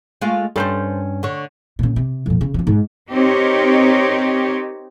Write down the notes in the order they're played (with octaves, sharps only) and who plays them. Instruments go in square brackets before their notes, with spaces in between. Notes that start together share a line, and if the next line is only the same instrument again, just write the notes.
[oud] G#3 A3 F4
[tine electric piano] G2 C#4 [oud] A4 B4 C5
[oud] D3 C#5
[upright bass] A#2 C#3
C3
F2 A#2
C#3
C#3 F3
G#2
[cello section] C4 D#4 G4 A#4 C#5